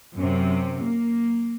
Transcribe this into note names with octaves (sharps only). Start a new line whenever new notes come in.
F#2 C3
A#3